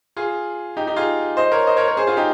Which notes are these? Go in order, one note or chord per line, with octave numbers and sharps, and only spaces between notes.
F4 G#4
D#4 G4
D#4 G4
F4 G#4
C5 D#5
A#4 C#5
C5 D#5
A#4 C#5
A#4 C#5
G#4 C5
F4 G#4
D#4 G4